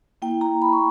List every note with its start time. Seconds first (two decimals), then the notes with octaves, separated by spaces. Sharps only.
0.22 A#3 E4 G5
0.41 A#5
0.62 B5
0.73 C#6